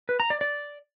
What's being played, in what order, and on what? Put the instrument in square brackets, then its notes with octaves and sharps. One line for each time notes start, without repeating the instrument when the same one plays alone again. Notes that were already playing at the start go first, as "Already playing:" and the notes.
[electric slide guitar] B4
A#5
D5
D5